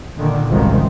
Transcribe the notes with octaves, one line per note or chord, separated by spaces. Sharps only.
A#2 D3 D#3
F#1 C2 G#2 C3 D#3 F3